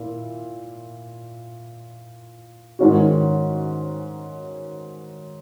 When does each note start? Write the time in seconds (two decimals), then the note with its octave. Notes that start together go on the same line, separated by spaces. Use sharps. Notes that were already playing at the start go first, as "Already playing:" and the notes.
Already playing: A#2 E4
2.79 G#2 D#3 G#3 C#4 F#4